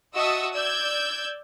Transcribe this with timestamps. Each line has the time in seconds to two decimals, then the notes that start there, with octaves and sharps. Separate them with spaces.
0.15 F#4 D#5 E5 A5 D#6 E6
0.53 D5 E6 G6 G#6